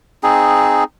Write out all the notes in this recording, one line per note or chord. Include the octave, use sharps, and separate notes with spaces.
C4 D#4 G#4